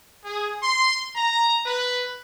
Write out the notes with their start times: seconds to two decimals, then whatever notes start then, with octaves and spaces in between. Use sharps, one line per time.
0.25 G#4
0.62 C6
1.16 A#5
1.65 B4